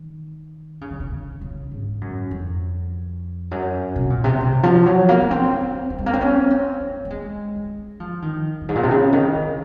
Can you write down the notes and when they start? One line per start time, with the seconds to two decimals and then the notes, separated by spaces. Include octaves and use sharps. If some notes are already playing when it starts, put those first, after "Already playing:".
Already playing: D#3
0.81 C#3
0.90 D#3
1.00 C#3
1.11 C#3
1.41 C#3
1.71 G#2
2.01 F#2
2.31 F2
3.51 F#2
3.96 C3
4.10 A#2
4.24 C3
4.41 C3
4.63 F3
4.86 F#3
5.09 A#3
5.21 A#3
5.31 C4
5.61 C4
5.90 C4
5.98 G#3
6.06 A#3
6.13 C4
6.21 C#4
6.50 C4
6.81 A#3
7.05 A#3
7.10 G#3
7.56 G#3
8.00 F3
8.22 D#3
8.61 F#2
8.69 G#2
8.75 A#2
8.83 C3
8.91 C#3
9.13 D#3
9.35 D#3